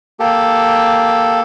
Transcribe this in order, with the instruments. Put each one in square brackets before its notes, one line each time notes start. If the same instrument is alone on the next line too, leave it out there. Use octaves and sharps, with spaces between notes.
[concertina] A#3 G4 A4